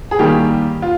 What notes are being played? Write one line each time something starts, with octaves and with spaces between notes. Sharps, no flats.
G#4
D#3 G3 A#3 G4
F4